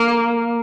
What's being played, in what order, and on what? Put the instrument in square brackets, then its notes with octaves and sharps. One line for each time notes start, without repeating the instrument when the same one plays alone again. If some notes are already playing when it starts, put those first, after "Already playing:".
Already playing: [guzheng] A#3